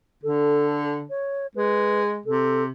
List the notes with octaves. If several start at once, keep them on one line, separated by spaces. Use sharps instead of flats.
D3 A4
C#5
G#3 B4
C3 A4